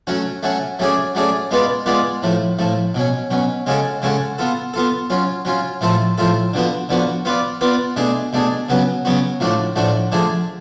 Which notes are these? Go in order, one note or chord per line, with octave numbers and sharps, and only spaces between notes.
F#3 A3 C#4 F#4
F#3 A3 C#4 F#4
F#3 A3 C#4 G#4 D5
F#3 A3 C#4 G#4 D5
G#3 B3 F4 B4 D5
G#3 B3 F4 B4 D5
A2 F3 A3
A2 F3 A3
B2 F#3 C#4
B2 F#3 C#4
C#3 G#3 C#4 F#4 A4
C#3 G#3 C#4 F#4 A4
B3 F4 A4
B3 F4 A4
F#3 C#4 F4
F#3 C#4 F4
A2 F3 A3 F4 A4
A2 F3 A3 F4 A4
D3 F3 B3 F#4
D3 F3 B3 F#4
B3 F4 B4 D5
B3 F4 B4 D5
B2 A3 D4 G#4
B2 A3 D4 G#4
C#3 F#3 B3 F#4
C#3 F#3 B3 F#4
A2 F3 A3 D4 F#4
A2 F3 A3 D4 F#4
D3 F3 A3 D4 G#4